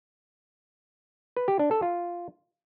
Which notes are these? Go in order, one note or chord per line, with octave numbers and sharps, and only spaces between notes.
B4
G4
D4
A4
F4